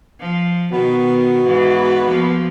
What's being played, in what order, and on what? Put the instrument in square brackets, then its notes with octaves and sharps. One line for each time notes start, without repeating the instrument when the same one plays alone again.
[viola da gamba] F3
[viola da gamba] B2 D#3 [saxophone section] B3 F#4
[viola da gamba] G#2 E3
E2 F3 A#3